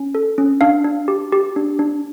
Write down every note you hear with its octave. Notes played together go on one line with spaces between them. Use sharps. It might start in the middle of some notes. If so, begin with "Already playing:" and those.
Already playing: C#4
A4
C#4
D4 F5
D4
G4
G4
D4
D4